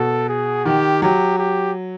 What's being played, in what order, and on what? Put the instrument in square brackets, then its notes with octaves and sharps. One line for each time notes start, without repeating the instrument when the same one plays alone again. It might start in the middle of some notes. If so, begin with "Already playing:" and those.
Already playing: [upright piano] B2 [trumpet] A4
[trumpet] G#4
[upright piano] D#3 [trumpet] G4
[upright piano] F#3 [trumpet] G4
[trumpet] G4